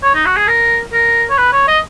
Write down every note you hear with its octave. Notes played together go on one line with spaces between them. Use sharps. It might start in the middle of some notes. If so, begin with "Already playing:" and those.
C#5
D#4
F#4
G#4
A#4
A#4
C#5
B4
C#5
D#5